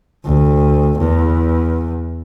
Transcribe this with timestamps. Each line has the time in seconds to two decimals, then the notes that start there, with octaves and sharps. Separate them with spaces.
0.25 D2
0.99 E2